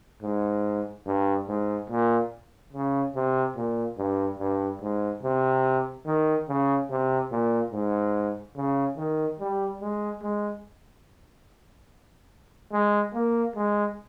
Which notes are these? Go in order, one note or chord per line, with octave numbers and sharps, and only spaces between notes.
G#2
G2
G#2
A#2
C#3
C3
A#2
G2
G2
G#2
C3
D#3
C#3
C3
A#2
G#2
C#3
D#3
G3
G#3
G#3
G#3
A#3
G#3